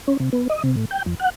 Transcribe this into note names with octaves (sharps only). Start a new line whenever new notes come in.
C#4
C3
B3
D#5
C3
A2
G5
F2
F#5